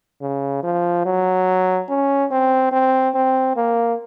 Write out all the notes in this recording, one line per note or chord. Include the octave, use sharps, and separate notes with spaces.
C#3
F3
F#3
C#4
C4
C4
C4
A#3